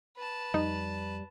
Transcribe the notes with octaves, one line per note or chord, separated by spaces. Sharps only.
B4 A5
F2 G3 D#4